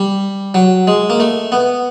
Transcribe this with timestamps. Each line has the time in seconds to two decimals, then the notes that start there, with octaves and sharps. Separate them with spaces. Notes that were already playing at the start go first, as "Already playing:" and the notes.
Already playing: G3
0.54 F#3
0.87 G#3
1.10 A#3
1.20 A3
1.52 B3